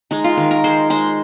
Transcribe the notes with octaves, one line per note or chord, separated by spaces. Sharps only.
G#3 D#4
F4
D#3
A#4
G#3 C5
G#3 C5